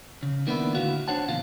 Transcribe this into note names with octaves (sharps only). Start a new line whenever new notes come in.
C#3
D#3 A#3 B3 D4 E4
A2 D3 E4 F#4 F5
D4 C5 C#5 F#5 A5
E2 A#2 C#3 F4 F5